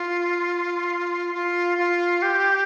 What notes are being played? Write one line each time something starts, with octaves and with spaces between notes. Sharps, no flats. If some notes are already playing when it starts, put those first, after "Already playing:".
Already playing: F4
F4
F4
G4